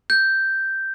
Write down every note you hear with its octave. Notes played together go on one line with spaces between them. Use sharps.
G6